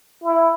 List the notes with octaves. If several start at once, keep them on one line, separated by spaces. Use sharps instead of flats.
E4